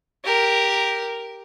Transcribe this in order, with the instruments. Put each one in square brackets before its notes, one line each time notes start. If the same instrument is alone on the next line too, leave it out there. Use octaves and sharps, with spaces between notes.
[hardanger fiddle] G4 A#4